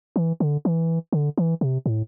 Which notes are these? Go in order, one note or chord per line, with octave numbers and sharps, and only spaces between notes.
E3
D3
E3
D3
E3
C3
A2